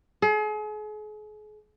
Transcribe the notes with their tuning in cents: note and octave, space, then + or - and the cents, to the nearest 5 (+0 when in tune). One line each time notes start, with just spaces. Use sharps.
G#4 +40